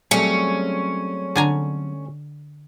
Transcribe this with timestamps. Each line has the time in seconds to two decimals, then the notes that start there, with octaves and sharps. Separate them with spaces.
0.11 F#3 G3 A3 C4 C#4 G#4
1.36 D3 G#5 A#5